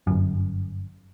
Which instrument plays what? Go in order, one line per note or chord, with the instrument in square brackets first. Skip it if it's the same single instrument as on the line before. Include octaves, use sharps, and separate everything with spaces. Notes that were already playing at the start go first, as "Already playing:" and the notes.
[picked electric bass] G1 F#2